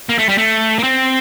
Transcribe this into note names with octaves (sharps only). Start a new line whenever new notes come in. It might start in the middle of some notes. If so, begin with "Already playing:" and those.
A#3
A3
G3
A3
A#3
C4